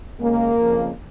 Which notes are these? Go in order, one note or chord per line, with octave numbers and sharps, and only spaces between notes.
D#2 C#3 G#3 A#3
F2 C#3 F3